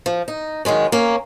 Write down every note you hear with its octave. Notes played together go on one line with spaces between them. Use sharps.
F3
D#4
D#3 F#3 G#3 C#4
A#3 C#4